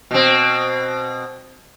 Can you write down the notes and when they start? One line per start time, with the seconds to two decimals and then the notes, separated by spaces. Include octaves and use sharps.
0.11 B2 C4